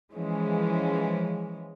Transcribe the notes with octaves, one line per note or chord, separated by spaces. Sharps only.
E3 F3 G#3 C#4